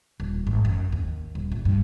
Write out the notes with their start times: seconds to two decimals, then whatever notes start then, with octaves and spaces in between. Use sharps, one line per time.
0.20 D#1
0.47 G#1
0.65 F#2
0.92 D#2
1.35 D#1
1.52 A#1
1.65 G2